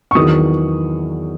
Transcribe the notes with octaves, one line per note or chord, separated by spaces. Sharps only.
C#6
E2 D#3 F#3 D#6